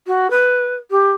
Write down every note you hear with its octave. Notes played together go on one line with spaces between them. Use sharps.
F#4
B4
G4